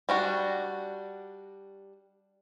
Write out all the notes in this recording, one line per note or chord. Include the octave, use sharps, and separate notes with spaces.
G3 D4 F#4